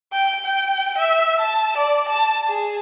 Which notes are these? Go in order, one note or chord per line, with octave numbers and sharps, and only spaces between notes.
G5
G5
E5
A5
D5
A5
G#4